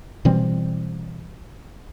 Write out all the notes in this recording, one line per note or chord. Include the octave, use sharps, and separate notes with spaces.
B2 E3 G3 C4